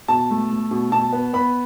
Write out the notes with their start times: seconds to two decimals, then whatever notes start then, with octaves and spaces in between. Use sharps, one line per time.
0.08 B2 A5
0.30 A3
0.51 A3
0.71 B2
0.91 B2 A5
1.13 B3
1.33 B3 B5